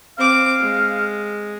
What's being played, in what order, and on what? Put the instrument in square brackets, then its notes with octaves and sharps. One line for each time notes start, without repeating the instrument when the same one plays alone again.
[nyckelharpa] C4 D6 [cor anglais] F5
[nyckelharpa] G#3